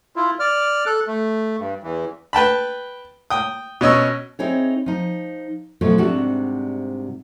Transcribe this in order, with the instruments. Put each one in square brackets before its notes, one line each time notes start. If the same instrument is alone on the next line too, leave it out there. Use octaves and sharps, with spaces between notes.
[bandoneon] E4 F4
D5 F6
A4 F#6
A3
G2
E2 E3
[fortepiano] B4 G5 A5 B5
G5 D#6
B2 C#4 D#5 E6
[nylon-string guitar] C4 D#4 E4 G#4 C5 C#5
F3 D#4
G#2 B2 F3 F#3 A3
G#2 C3 G3 D4 F#4